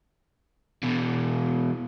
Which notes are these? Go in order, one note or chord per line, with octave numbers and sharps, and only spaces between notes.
E2 B2